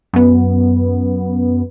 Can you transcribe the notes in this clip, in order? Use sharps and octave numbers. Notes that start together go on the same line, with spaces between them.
F#2 B3